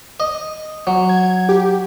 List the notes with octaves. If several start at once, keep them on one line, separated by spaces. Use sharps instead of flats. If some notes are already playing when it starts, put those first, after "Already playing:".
D#5
F#3
G#6
G4